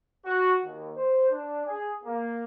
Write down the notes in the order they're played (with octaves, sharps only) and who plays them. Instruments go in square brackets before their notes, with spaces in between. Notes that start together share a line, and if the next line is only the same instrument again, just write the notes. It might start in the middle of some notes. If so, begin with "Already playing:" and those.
[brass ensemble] F#4
D#2
C5
D4
G#4
A#3